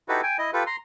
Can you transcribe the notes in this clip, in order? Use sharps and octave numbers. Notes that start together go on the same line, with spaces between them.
D#4 E4 F#4 G4 A4 B4
G5 G#5
E4 D#5
F4 G4 A4 B4
A#5 C6